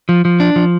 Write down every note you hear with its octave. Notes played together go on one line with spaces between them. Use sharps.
F3
F3
D4
F3